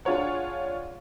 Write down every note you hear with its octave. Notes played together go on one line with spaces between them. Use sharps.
D4 F4 G#4 C#5 F#5